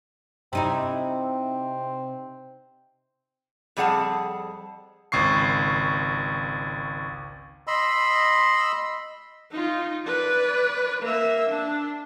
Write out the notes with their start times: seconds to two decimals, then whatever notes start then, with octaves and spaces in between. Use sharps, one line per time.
0.53 C3 C4 D#4 E4
3.77 F2 G3 G#4 F#5 A5
5.12 G#1 C#2 C#6 C7
7.67 D#5 B5 C6 E6
9.51 D#4 F4
10.06 B4 D5
11.02 A#3 E5
11.49 D4